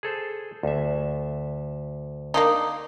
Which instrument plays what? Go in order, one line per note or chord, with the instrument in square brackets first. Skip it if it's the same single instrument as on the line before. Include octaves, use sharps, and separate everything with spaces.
[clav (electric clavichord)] G#4 A4 C5
D2 E5
[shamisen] A#3 D4 D#4